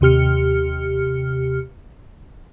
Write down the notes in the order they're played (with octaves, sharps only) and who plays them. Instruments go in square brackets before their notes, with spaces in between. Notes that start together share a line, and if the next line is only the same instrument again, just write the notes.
[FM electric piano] D#2 C3 G4 F6 C#7